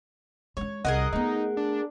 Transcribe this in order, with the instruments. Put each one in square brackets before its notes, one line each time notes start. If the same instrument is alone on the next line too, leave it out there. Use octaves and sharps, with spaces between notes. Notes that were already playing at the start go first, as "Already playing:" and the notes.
[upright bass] G#3 D4 [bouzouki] C#5
[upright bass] C2 [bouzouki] G#4 A#4 F#5 [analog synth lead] D#5
[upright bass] A3 B3 [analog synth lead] D#4
[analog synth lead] D4